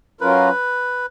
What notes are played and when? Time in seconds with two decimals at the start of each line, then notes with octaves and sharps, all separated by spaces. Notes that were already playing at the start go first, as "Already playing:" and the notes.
0.21 F#3 C#4 F4 A#4 B4